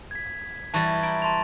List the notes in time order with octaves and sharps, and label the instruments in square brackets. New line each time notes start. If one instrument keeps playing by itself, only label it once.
[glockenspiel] G#6 B6
[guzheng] E3 G3 G4 [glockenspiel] A5 C#6 A#6
[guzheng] E4 G5 [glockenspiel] A#5 A6 D7
[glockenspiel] A5 C6 F7